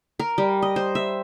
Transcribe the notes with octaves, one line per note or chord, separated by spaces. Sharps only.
A#4
G3
D#5
C5
E5